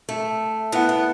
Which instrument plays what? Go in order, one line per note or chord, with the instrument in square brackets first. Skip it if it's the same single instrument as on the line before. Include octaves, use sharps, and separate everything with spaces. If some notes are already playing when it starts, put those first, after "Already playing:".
[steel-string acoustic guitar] A3
[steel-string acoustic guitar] B3 [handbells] E4 B4 F#5 A5
[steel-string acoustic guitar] B3